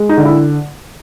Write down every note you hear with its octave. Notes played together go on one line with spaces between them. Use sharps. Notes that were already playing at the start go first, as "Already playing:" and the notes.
Already playing: G#3
D#4
D3
E4